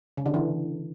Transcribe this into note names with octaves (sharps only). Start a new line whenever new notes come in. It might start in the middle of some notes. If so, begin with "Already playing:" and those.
C#3
D3
E3